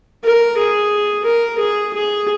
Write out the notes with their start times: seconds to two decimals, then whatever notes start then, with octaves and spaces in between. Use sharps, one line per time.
0.24 A#4
0.57 G#4
1.25 A#4
1.59 G#4
1.93 G#4